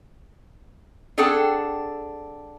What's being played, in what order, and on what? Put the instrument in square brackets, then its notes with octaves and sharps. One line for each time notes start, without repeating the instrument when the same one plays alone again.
[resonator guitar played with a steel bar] C4 D4 G#4 A4 F#5 G5